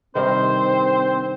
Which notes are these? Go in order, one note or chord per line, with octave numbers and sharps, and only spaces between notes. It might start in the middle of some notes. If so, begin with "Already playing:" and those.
G2 C3 D#3 C4 C5